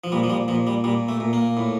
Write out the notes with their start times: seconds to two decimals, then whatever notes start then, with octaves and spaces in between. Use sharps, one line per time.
0.04 F3
0.12 A#2 G3
0.23 F3
0.30 G3
0.48 A#2 F3
0.67 G3
0.84 A#2 G3
1.08 A3
1.20 A#2
1.33 A#3
1.57 A2